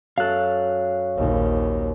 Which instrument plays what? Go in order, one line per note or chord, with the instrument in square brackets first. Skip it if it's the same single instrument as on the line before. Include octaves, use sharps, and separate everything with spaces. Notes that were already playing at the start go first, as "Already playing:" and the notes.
[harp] F#2 A4 [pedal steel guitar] F5 F#6
[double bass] A#1 D#2